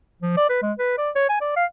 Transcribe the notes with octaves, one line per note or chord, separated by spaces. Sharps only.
F3
D5
B4
G#3
B4
D5
C#5
G#5
D5
F5